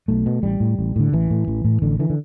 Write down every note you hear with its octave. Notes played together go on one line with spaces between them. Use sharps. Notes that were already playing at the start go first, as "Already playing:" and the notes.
B1 A3
B2
A1 G3
A2
A1
A2 D3
A1 E3
A2
A1
A2
A1 D3
D3 E3
D3